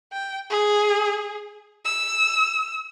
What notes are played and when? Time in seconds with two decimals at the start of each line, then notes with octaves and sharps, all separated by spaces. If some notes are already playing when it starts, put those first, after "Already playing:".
0.12 G5
0.50 G#4
1.85 E6